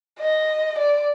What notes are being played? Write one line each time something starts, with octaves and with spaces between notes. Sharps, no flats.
D#5
D5